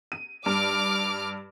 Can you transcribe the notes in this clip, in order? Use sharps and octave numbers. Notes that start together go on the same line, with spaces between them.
D#7
G2 D6 F6